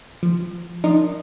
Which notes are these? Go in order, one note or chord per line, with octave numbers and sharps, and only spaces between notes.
F3
F3 D4 D#4 A#4 D#5